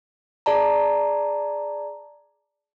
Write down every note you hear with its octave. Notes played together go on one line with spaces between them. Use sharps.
G#4 D5 A5 A#5